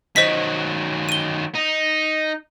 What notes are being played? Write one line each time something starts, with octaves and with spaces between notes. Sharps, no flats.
D#3 F#3 C5 D#5 B6
D#7 G7
D#4